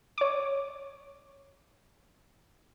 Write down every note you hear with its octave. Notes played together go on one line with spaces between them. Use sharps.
C#5 D6